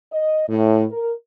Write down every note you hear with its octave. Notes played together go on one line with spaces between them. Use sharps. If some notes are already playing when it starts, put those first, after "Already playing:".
D#5
A2
A#4